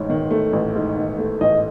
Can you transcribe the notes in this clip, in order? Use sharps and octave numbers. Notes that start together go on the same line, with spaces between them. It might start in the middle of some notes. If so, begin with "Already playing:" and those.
Already playing: A1 G#2 C#5
D#3
A3
A1
G#2
D#3
A3
A1 D#5